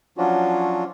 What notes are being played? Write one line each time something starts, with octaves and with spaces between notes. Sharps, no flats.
F3 F#3 C#4 D4 F4 F#4